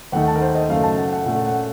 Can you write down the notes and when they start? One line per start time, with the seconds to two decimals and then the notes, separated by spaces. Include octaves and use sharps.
0.12 D#2 D#3 A3 D#4 F#5
0.22 F#5
0.28 A5
0.35 A#4
0.41 C5
0.55 D#5
0.69 F#2 C#3 A3 F5
0.83 A5
0.98 F#5
1.12 F#5
1.26 A#2 A3 C#4 F#5
1.45 F#5